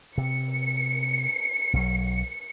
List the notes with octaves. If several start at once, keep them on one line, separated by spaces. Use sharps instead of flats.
C3 C#7
B1 F#3